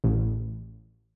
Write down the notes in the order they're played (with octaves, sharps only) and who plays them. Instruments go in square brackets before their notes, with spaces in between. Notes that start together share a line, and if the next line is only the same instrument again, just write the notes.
[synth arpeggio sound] A1